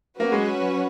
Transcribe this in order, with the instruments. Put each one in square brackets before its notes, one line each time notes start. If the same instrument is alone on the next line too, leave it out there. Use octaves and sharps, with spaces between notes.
[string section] F#3 C#4 F#4 B4 [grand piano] A#3
[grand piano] G#3